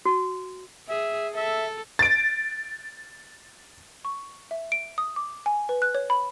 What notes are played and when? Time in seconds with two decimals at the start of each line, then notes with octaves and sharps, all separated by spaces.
0.05 F#4
0.88 G#4 E5
1.35 A4 E5
1.99 A6 D7
4.05 C#6
4.51 E5
4.72 D7
4.98 D#6
5.16 D6
5.46 G#5
5.69 B4
5.82 F#6
5.95 C#5
6.10 B5